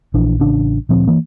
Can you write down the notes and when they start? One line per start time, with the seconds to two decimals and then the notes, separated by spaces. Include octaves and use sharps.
0.14 A#1 E3 D4
0.40 A1 C#3 D4
0.89 D2 A#2 F3 C4
1.07 E3 A#3